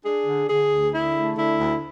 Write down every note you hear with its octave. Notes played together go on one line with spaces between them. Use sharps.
D4 G#4
D3
D3 G#4
D2
D3 E4
A3
D3 E4
D2